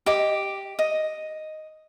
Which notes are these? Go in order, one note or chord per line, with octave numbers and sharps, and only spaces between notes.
G4 D#5 D6
D#5